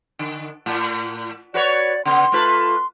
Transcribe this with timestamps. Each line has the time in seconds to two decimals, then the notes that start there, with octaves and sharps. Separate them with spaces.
0.19 D3
0.66 A2
1.54 F#4 B4 C#5 D5
2.05 C#3 B3 C6
2.32 A3 F4 B4